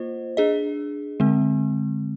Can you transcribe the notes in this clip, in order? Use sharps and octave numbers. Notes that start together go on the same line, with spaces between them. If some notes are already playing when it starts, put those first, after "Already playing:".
Already playing: A#3 F4 C5 D#5
D4 G#4 D#5
D3 G#3 C4